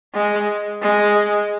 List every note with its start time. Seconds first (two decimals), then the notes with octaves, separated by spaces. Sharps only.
0.14 G#3
0.82 G#3